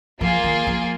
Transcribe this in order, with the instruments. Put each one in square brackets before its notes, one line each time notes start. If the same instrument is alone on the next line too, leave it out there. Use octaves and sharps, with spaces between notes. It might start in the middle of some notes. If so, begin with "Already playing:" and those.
[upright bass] F3 [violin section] A#3 F4 G#4
[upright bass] D#3
F3